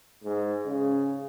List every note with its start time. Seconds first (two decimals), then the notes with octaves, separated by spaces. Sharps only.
0.24 G#2
0.67 C#3